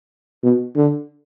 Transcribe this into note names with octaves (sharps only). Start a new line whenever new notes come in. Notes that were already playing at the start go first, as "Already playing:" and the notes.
B2
D3